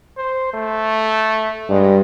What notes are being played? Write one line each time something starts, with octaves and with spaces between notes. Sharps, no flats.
C5
A3
G2 G#3